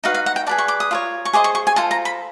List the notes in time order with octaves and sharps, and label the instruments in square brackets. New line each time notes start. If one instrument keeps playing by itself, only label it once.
[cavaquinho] D#4 F#4 B4 F5
F5
F#5
G5
G#4 B4 D5 A5
C#6
D6
D#6
F4 A#4 C#5
C#6
G#4 C5 D#5 D6
C#6
C#6
G#5
F4 A4 C5 A5
A#5
B5